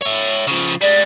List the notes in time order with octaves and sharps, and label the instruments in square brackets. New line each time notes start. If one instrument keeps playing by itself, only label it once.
[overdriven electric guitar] C#5 E5
C#3 F3
[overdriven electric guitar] G3 G#3 [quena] D5